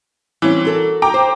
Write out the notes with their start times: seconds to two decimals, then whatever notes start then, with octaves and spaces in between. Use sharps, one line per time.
0.42 E3 G3 C4 C#4
0.65 F#4 A4 A#4
1.02 G5 A#5 D6
1.14 C5